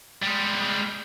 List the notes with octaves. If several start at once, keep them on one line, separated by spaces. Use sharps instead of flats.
G3 G#3